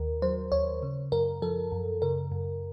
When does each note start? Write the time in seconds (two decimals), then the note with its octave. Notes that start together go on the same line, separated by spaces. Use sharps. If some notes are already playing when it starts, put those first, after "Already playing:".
Already playing: D#2 D#3 A#4
0.22 F#3 C5
0.52 D#2 C#5
0.83 C#3
1.12 F#2 A#4
1.42 F3 A4
1.72 F#2
2.02 C#3 A#4
2.32 F#2